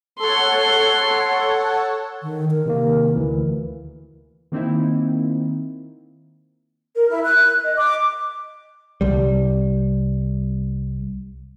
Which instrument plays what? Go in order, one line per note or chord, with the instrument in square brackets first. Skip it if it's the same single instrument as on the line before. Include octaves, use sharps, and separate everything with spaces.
[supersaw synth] A4 C#5 F#5 [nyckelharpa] C6
[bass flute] D#3
A#4
[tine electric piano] C3 D#3 A#3
D2 E3
[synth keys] D#3 A#3 C4 D#4 E4
[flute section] A#4
E4
F#6
D#5
D6
[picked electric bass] C2 G3